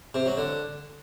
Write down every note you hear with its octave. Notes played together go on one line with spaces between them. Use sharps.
C3
F#3
D3